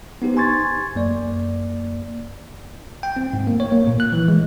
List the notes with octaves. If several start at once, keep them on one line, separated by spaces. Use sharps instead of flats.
B3 D#4 G4 C5
G#5 C6 C#6 G#6 A6
F#2 A#3 D5
G5
C4
G#2
A#3
C#5
A#3
A#2
F#6
E3
G#3